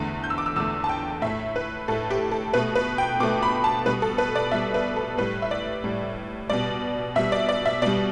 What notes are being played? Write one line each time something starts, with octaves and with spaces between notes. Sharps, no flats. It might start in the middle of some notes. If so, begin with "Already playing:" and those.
Already playing: E2 D3 A3
G6
E6
D6
E6
E2 D3 A3 E6
A5
G5
A2 A3 E5
B4
A2 A3 A4
G4
A4
B2 A3 B4
B4
G5
B2 A3 D6
B5
A5
B2 G3 B4
A4
B4
D5
B2 G3 E5
B4
A4
A2 G3 B4
E5
D5
A2 G3
B2 G3 D5
B2 G3 E5
D5
D5
E5
B2 G3 D5